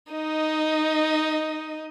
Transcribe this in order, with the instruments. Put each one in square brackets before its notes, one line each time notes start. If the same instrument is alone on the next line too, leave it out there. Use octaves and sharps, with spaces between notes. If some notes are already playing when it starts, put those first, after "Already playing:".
[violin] D#4 D#5